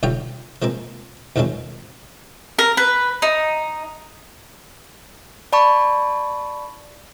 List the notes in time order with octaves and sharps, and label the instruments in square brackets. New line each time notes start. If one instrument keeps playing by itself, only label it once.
[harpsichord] B1 D3 F#3 G3 F4 G5
F3 G#3 A#3 C4
E2 D#3 F3 F#3 G#3 C4
[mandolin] A#4
B4
D#4
[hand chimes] D5 A5 B5 C#6